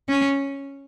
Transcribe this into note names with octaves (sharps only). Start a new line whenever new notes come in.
C#4